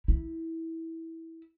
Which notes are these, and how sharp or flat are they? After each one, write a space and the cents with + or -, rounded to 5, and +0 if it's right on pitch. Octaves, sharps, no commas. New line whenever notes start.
E4 -15